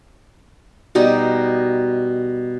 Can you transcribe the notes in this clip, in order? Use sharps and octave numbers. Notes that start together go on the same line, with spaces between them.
B2 G3 D#4